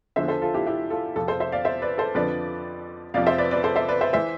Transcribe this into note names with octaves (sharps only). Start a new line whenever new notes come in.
E2 D3 F3 C5 E5
A4 C5
F4 A4
E4 G4
E4 G4
F4 A4
F2 C3 F3 F4 A4
A4 C5
C5 E5
D5 F5
C5 E5
B4 D5
A4 C5
F2 D3 F3 B4 D5
F2 C3 F3 D5 F5
C5 E5
B4 D5
B4 D5
A4 C5
C5 E5
B4 D5
C5 E5
E3 C5 E5